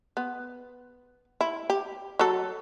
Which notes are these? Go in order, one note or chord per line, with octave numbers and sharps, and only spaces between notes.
B3
E4
G4
F#3 A4